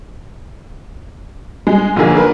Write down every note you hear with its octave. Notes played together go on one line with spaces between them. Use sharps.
G#3
B1 D3 F3 A#3 G#4
A#4 B4